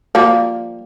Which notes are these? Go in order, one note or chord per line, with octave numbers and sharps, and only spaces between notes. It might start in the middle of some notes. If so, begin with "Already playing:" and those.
F3 G3 A#3